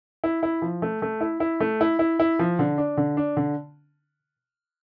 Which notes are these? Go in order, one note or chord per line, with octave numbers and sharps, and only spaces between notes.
E4
E4
F3
A3
A3
E4
E4
A3
E4
E4
E4
F3
D3
D4
D3
D4
D3